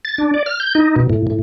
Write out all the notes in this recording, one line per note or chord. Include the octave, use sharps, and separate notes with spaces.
A6
D4
D5
F6
G6
D#4
B2
A2
A2